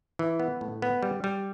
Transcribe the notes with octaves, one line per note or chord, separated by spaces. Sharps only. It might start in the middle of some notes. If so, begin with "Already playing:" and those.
E3
B3
A2
B3
G3
G3